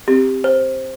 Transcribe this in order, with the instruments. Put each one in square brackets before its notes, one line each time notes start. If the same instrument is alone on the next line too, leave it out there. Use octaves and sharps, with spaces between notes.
[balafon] C4 [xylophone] G4
[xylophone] C5